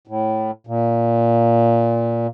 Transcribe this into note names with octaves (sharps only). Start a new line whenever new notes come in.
A2
A#2